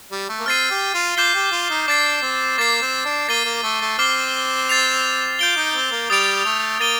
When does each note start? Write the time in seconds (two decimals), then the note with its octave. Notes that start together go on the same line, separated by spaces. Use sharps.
0.11 G3
0.29 A3
0.40 A#3
0.46 C4 F6 A6 C7 D#7
0.70 G4
0.94 F4
1.16 F4 D6 G6 C7 G7
1.34 G4
1.52 F4
1.70 D#4
1.88 D4 D6 A6 C7
2.22 C4
2.58 A#3 D6 A6 C7
2.82 C4
3.05 D4
3.28 A#3 A6 C7 D#7 G7
3.45 A#3
3.63 A3
3.81 A3
3.99 C4 D6 F6 C7 G7
4.69 A6 C7 F7
5.39 F4 G6 D7 G7
5.56 D#4
5.75 C4
5.91 A#3
6.10 G3 D#6 A6 D7 F7
6.45 A3
6.80 A#3 A6 D#7 G7